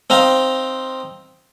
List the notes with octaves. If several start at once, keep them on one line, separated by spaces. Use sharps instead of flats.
C4 D#4 F5 A#5